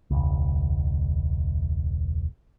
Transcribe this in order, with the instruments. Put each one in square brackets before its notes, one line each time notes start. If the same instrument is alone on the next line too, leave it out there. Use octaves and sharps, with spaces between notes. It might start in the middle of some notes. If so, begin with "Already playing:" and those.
[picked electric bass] E1 C#2